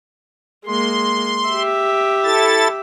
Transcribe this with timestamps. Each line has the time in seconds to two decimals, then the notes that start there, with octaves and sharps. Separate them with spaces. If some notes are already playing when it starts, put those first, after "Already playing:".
0.66 G#3 A#3 C6
1.49 G4 E5
2.24 E4 A4 A6